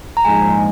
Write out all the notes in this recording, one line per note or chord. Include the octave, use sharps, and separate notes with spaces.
A#5
A#1 G#2 F3 G#3 G#5